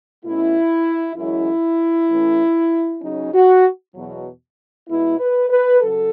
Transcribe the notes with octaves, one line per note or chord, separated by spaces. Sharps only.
B2 A3 C#4 E4
F#2 E3 G#3 C#4 E4
A2 E3 A3 C#4
C#3 F#3 C#4 D#4
F#4
E2 B2 F#3
B2 G#3 B3 E4
B4
B4
C#3 F#3 A4